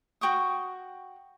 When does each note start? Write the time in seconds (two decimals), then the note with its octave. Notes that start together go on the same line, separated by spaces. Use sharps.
0.21 F#4 G5 C#6 D#6